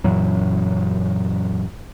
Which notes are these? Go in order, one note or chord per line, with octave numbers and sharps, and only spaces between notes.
F#2 A#2 E3 F#3